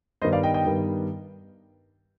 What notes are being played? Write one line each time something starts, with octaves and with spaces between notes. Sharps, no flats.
G2 D#3 G3 B3 C5 D#5
D5 F5
D#5 G5
D#5 G5
G2 D#3 G3 B3